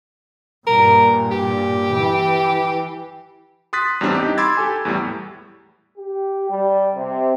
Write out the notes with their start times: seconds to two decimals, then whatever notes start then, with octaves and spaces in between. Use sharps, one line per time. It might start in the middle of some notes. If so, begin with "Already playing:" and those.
0.67 G2 A#2 A#4
1.31 G4
1.94 E3
3.73 C6 D#6 F#6 A6 B6
4.01 E2 A2 G3 C4 D4
4.15 D#4 G4
4.38 B5 C6 D6 E6 G#6 A6
4.57 G4 A4 G#5
4.85 E2 A2 G3
5.98 G4
6.50 G3
6.95 C3